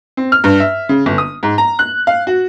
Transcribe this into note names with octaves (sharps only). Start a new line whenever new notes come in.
C4
F6
G2
E5
C#3
G1
D#6
G#2
A#5
F#6
F5
F#4